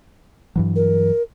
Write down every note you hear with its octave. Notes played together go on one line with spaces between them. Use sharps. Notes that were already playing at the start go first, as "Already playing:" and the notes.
G2 E3 F#3
A#4